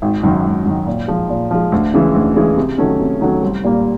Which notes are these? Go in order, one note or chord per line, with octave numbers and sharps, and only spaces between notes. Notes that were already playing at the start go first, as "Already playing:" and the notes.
G#1
F#2 D#3
G#1
F#2 D#3
A#2
F3 G#3
A#2
F3 G#3
D2
C#3 E3 G#3
D2
C#3 E3 G#3
C3
D#3 F#3 A3 C#4
C3
D#3 F#3 A3 C#4
C2
A#2 G3 A#3